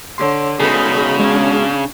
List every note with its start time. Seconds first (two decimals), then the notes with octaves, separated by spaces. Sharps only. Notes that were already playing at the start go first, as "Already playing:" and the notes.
0.18 D3 C#5 C6
0.60 C#3 B3 D#4 F#4 G#4 A4 B5
1.19 G#3 C#4 D4